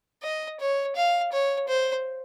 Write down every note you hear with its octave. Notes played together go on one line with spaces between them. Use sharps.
D#5
C#5
F5
C#5
C5